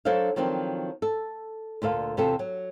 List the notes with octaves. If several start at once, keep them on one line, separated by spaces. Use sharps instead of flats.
F#3 D4 A4 C5 C#5 F5
D#3 F3 F#3 C4 D4
A4
D2 A#2 A4 F5
E2 C3 F4 A4
F#3